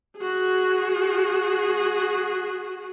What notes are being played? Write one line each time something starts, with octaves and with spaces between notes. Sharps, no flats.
F#4 G#4